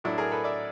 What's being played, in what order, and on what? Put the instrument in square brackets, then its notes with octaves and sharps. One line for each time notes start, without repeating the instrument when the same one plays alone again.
[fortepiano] A2 F#3 D4 E4
G#4 A#4
A4 B4
D5 E5